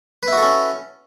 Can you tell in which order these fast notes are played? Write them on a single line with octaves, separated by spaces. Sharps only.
B4 E4 F#4 A4 C#4